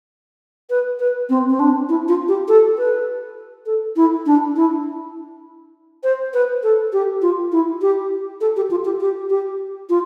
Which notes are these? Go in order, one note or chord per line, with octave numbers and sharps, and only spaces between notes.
B4
B4
C4
C4
D4
E4
F4
G4
A4
B4
A4
E4
D4
E4
C5
B4
A4
G4
F4
E4
G4
A4
G4
F4
G4
G4
G4
F4